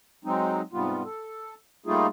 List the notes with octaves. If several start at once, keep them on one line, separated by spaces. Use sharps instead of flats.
F#3 G#3 C4 D#4
G#2 C3 G3 B3 F4
A4
G3 A3 A#3 D#4 F4 G#4